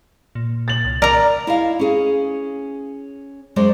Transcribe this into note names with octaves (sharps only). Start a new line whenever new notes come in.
A#2
A6 F#7
C2
A#4 D5 A#5
E4 D#5 F5
C#4 G#4
F#2 G#3 C5 D5